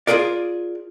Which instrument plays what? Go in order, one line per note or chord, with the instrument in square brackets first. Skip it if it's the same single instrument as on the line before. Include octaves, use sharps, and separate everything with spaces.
[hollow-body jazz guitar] F4 F#4 G#4 A#4 D5